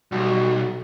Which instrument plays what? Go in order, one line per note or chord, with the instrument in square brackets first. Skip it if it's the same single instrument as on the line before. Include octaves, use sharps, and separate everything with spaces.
[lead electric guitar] B1 [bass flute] G3 [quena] F#4